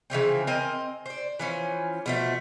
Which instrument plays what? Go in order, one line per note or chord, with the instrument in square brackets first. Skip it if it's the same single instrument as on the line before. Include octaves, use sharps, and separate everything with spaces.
[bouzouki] C#3 E3 F3 C4
C4 A#4 D#5 G#5
C5 D5
E3 F3 C#4
B2 F3 A3